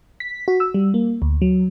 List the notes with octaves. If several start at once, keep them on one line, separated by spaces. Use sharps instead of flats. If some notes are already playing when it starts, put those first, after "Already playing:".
B6
F#4
E6
G3
A#3
D2
F#3